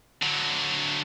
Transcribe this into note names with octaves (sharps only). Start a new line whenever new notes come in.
D3 F#3